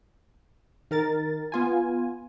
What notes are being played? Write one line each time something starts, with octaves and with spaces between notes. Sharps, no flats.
D#3 A#4 A6
B3 F4 G#5